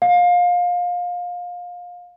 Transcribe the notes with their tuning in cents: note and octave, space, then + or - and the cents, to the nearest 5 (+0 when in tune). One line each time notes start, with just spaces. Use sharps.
F5 +25